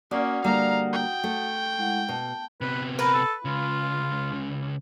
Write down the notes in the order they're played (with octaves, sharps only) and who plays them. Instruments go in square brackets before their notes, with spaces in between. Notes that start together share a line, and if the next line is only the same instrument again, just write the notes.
[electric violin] A#3 C#4 [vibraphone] F#4 F#5 D#6 [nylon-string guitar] D5
[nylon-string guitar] D3 G3 A#3 [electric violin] F5 A#5
[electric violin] G5
[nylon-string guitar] A3
[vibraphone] G#3 E4 F#5
[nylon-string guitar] B2 [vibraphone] A5
[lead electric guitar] C3 B3 [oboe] B4
[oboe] A#4 [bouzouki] B4
[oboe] A4
[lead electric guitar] C#2 C#3 [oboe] F4